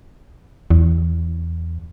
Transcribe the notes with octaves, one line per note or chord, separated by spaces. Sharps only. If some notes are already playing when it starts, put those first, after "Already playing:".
E2